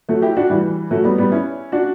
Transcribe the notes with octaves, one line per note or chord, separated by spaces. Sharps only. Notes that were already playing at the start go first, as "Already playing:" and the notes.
F#3 A3
E4 G4
D4 F#4
E3 G3
F#3 A3
G3 B3
G3 B3
C#4 E4
D4 F#4